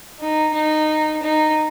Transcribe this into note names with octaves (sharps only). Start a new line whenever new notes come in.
D#4
D#4
D#4